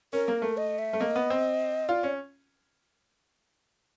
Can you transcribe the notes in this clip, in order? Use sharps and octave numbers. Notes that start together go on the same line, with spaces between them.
C#4 A#4
A#3
A3
D#5
E5
A3
A#3 D#5
B3
C4
F4 D5
C#4